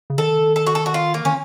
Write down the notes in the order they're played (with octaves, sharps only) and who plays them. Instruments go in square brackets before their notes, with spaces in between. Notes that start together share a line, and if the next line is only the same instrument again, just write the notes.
[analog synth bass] C#3
[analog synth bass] D#3 [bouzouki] A4
[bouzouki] A4
F#4
A4
F#4
F4
A#3
[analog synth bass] D#3 [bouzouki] C#4